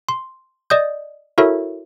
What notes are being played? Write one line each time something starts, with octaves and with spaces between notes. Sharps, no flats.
C6
D5 D#5 D#6 G6
E4 F#4 A4 A#4 C#5 E5